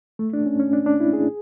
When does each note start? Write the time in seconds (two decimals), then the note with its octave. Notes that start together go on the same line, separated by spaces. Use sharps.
0.19 A3
0.33 D4
0.46 C#4
0.60 C#4
0.73 D4
0.86 D4
1.00 E4
1.13 G#4